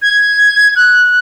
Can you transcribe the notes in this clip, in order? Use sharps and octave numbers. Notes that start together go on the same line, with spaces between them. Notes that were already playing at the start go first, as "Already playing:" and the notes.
G#6
F#6